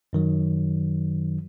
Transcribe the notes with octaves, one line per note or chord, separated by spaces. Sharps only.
F#2 D#3 F#3